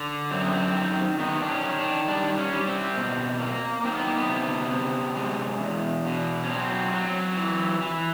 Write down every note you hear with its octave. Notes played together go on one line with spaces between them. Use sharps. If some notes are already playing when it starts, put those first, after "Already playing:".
Already playing: D3
F#2 C4
B3
C4
D#3
D#3 B3
D4
C#4
D#3
D4
G3 D4
C#4
G3
C4
B2
A#3
D#3 C4
B3
A#3
B3
C3
C3
G#3
E2
B2
C#4
F#3 C4
F#3
E3
E3